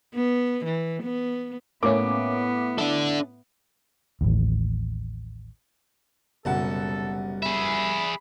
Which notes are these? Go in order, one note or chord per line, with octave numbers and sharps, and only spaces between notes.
B3
E3
B3
A2 A#3 B3 C#4 D6
D4 E4 A4
A1 D#2
F#1 C2 B2 A4 F#5 A5
G#4 E5 B5